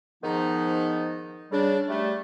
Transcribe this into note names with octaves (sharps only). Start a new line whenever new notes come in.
G#2 D#3 F3 B3 D#4
C#3 G3 D4
G3 A3